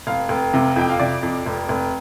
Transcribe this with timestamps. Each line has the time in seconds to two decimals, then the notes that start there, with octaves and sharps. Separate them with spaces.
0.07 F1 F5
0.29 F1
0.54 C3
0.76 F2 G5
0.90 F5
1.00 C3 D5
1.23 F2
1.46 F1
1.69 F1